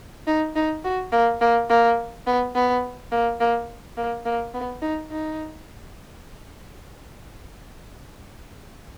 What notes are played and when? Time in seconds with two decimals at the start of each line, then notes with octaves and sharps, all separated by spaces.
0.27 D#4
0.56 D#4
0.84 F#4
1.12 A#3
1.41 A#3
1.70 A#3
2.27 B3
2.55 B3
3.12 A#3
3.40 A#3
3.97 A#3
4.25 A#3
4.54 B3
4.82 D#4
5.11 D#4